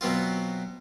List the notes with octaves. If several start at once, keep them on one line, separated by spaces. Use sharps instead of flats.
B2 F#3 B3 C4 F4